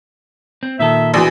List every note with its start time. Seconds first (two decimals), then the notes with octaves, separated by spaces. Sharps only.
0.63 C4
0.79 A#2 D#3 A4 E5
1.14 A#1 B2 E3 D#6